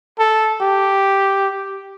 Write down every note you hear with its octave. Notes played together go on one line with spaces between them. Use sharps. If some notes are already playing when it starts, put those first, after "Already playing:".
A4
G4